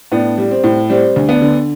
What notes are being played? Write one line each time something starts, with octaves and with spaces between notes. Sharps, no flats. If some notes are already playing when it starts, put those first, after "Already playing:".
A2 B3 D4
G3
C4
A2
G3 C4
D2
B3 D4
D3